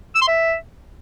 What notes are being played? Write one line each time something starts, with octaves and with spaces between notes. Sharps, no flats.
E6
C6
E5